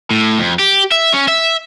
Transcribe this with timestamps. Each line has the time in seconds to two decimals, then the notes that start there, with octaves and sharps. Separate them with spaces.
0.11 A2
0.39 F2
0.59 G4
0.92 E5
1.13 C#4
1.28 E5